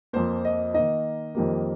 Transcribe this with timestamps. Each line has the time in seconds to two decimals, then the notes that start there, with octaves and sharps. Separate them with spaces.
0.13 F2 F3 A#3 C5
0.45 D#5
0.74 D#3 A#3 D#4 D#5
1.35 F2 D#3 G3 A#3